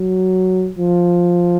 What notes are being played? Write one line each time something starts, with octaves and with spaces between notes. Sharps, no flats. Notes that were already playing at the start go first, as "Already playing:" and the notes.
Already playing: F#3
F3